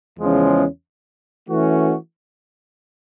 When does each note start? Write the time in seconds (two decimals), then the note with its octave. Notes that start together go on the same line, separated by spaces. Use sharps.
0.18 E2 C#3 F3 G#3 C#4
1.49 E3 A3 C#4 F#4